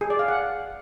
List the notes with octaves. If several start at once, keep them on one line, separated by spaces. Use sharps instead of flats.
G#4
D5
F5
F#5